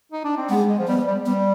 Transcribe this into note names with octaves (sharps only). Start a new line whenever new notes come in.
D#4
D4
C4
G#3 B3
G#3
F3
G3 B3
G3
G3 B3